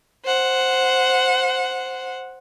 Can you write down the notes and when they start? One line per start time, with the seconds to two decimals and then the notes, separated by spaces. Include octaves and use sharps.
0.25 C5 F#5